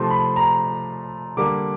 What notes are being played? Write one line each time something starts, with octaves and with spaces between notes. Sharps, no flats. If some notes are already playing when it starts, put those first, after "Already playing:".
Already playing: C3 F3 A3 C6
B5
A#5
D3 G3 A#3 D6